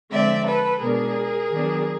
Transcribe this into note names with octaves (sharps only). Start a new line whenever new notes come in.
D3 F3 G#3 C4 D5 E5
A4 B4
B2 G#3 B3 D4 G#4 A#4
D#3 F#3 B3 D4